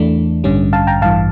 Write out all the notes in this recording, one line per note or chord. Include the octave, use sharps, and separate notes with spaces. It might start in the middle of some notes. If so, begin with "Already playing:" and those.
Already playing: E2 E3 A3 D4
A1 G2 D3 G3 C#4
F5 A5
G5 A#5
A1 G2 E3 F5 A5